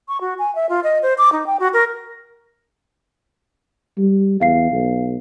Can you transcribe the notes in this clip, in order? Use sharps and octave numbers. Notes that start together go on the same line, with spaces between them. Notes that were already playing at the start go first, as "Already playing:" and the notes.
C#6
F#4
G#5
E5
F4
D#5
C5
D6
D#4
G5
F#4
A#4
G3
E2 E5 F5 C7
B1